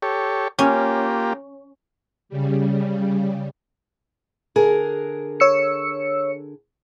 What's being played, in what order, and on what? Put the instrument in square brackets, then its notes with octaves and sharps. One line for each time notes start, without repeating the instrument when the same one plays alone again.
[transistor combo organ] G4 A4 C#5
[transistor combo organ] A#3 F4 G4 [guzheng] C#4
[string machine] C#3 G3
[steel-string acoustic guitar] D3 G#4 A#4
[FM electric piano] C#5 E6 C#7